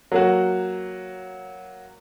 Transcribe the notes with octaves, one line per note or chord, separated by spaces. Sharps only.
F#3 A#3 F#4